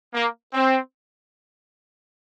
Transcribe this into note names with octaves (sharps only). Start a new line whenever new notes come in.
A#3
C4